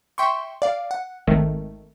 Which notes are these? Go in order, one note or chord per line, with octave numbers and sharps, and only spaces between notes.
E5 G5 C6 C#6
D5 F5
F#5
G#1 D#3 A3